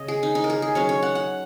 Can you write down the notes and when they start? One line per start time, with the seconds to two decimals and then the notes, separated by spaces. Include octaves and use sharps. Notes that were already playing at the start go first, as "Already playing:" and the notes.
Already playing: C#3 D#5
0.08 G#4
0.23 D#4
0.35 D#4
0.44 A#4
0.50 G#4
0.62 G#4
0.75 F#3 C#4 C#5
0.89 C#5
1.02 F#5
1.15 F#5